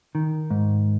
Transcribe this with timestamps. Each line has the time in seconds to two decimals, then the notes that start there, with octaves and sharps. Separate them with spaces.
0.15 D#3
0.50 G#2